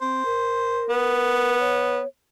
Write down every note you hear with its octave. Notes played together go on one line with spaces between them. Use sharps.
C4 C5
A#4
B3
C#5